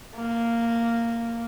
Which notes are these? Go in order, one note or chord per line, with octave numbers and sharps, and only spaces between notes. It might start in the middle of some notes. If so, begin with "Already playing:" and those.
A#3